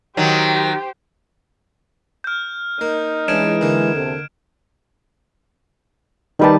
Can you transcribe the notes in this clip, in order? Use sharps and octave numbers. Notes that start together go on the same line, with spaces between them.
D#3 F#3 G4 C5
F6 G6
A#3 D#4
E3 G#3 C#4 D4 G#6 D7 E7
D3 A#3
E2 C3 A4
D#3 G3 D#4 G4 B4 A5